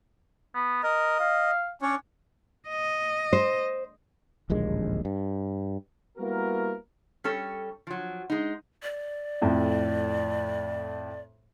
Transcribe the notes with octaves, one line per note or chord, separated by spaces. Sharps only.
B3
A#4 D#5
F5
C#4 D4 C#5
D#5
C5
D1 A#1 D#2 G#3
G2
G3 A#3 B3 E4 F#4 A#4
G3 C#4 A4 C#5
F3 F#3
G#3 D#4
D5
F2 A2